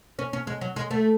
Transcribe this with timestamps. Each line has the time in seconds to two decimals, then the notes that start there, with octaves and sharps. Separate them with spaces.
0.19 C#4
0.33 C#4
0.47 G#3
0.61 F#3
0.76 G#3
0.91 A3